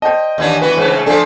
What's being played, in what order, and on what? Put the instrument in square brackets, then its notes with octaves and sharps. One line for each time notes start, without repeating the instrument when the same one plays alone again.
[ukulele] C5 D5 A5 [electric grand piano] D#5 G5
[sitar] D#2 E3 D4
[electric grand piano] E3 B4 [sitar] B3 F#4
[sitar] G#2 C#3 A3
[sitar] F3 A3 D4 [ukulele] A4 [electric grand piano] G#5 C7